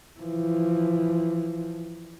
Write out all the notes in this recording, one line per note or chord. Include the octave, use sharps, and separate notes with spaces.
E3 F3